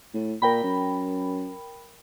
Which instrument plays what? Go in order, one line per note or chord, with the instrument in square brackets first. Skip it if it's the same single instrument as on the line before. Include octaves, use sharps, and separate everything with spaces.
[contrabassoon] A2
[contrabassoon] A#2 [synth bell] A#4 G5 B5
[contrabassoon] F#2